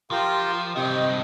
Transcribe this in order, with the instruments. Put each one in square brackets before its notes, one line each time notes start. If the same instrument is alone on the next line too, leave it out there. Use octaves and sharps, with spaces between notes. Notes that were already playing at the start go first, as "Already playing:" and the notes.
[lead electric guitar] F3 [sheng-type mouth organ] F4 G4 A#4
[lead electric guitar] G2 D#3 [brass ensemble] C3 D#5 [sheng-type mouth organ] G4